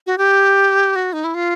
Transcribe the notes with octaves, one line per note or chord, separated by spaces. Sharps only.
F#4
G4
F#4
D#4
E4
F4